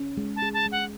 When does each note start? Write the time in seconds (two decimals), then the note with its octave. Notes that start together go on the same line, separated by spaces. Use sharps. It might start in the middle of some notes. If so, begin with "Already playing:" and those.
Already playing: C#4
0.17 G#3
0.36 A5
0.42 G#4
0.54 A5
0.66 G#3
0.72 F#5